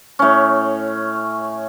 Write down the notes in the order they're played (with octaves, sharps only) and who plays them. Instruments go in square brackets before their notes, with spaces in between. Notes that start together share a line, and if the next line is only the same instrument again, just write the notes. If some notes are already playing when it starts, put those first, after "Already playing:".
[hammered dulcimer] A2 C#4